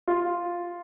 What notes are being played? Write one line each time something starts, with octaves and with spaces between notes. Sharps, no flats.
F4